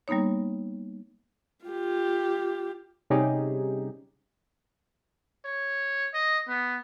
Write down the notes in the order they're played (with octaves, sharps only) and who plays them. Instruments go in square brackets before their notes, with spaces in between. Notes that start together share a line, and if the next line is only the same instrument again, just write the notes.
[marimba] G3 A#3 B3 D#4 C#5
[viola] F4 G4
[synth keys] C3 G3 C#4 D#4 G4 G#4
[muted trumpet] C#5
D#5
B3